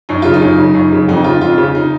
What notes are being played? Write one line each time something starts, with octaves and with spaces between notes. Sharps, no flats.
F#2 D#4
C#3 F4
D#4
F#2
C#3
F#2
C#3
F2 D#4
C#3 F4
F2 F4
C#3
D#4